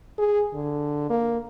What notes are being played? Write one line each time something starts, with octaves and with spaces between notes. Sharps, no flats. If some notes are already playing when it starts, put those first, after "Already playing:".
G#4
D3
A#3